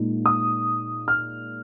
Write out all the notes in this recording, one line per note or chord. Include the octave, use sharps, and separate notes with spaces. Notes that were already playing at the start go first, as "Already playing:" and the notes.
Already playing: A#2 G#3 D#4
D#6
F6